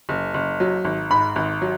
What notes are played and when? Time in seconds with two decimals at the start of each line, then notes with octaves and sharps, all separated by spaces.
0.09 F#1
0.34 F#1
0.60 F#3
0.85 G#1
1.10 G#2 B5
1.36 G#1
1.61 F#3